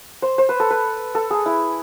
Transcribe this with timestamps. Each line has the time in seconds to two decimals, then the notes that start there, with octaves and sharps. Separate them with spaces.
0.22 C5
0.38 C5
0.49 B4
0.60 A4
0.70 B4
1.15 A4
1.31 G#4
1.46 E4